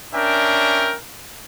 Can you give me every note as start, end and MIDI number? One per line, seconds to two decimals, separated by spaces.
0.14 0.94 61
0.14 0.94 62
0.14 0.94 70
0.14 0.94 76
0.14 0.94 79